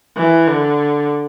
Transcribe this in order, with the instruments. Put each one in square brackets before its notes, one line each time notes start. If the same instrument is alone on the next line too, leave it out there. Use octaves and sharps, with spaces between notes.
[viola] E3
D3